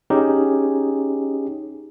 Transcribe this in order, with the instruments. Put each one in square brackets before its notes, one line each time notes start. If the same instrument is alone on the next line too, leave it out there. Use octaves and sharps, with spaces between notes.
[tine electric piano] C#4 D#4 G4 G#4